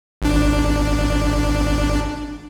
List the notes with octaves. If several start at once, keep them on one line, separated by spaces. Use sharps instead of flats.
G#1 D4